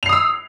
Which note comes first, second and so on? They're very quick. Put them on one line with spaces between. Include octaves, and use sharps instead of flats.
F7 C7 D#6 E6